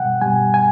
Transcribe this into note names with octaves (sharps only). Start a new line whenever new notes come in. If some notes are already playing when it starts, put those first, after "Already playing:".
Already playing: B2 G3 F#5 G5
B2 G3 G#5
G#5